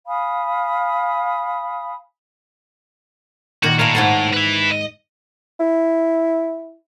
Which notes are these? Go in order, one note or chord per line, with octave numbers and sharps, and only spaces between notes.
F5 G#5 B5 D#6
A#2 D#3 F#4
A2 A#4 F5
G#2 F#5 A5
B4 E5
D#5
E4